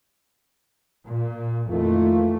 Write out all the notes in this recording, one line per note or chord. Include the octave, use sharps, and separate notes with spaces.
A#2
F2 D#3 E3 A3 A#3 F4